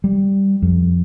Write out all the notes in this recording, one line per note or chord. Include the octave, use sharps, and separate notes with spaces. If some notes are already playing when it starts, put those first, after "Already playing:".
G3
F2